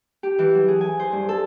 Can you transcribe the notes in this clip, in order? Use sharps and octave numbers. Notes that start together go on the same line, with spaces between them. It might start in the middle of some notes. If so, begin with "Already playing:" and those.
G4
E3
F#3
G#4
G#5
C5
G2
A4